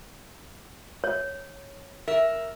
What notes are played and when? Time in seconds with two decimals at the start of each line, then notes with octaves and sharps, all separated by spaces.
1.04 C#5
2.08 A#4 E5